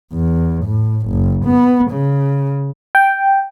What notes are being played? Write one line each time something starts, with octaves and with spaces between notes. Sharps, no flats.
E2
A2
F#1
B3
C#3
G5